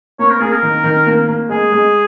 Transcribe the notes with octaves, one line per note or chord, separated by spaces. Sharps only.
A#3 C#5
A#4
A#3 G#4
A#4
D#3
D#3
A#3
A#3
G#3 G#4
G#3